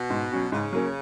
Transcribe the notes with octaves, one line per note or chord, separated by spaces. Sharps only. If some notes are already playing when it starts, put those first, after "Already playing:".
Already playing: B2
G#2
F#3 C#4 F#4
G#2 C#3
F#3 A#3 C#4